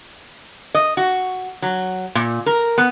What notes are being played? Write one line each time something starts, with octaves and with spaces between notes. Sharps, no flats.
D#5
F#4
F#3
A#2
A#4
B3